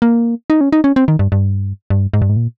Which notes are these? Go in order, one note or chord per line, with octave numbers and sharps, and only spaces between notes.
A#3
D#4
C#4
D#4
C#4
C4
D#3
G2
G2
G2
G#2
G2
G#2
A#2